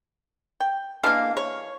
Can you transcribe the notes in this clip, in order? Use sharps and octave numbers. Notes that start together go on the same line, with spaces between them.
G5
E3 G#3 A#3 D4 F5
C#5